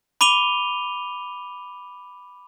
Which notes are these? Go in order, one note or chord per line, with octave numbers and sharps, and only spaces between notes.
B5 D6 D#7 F7 G7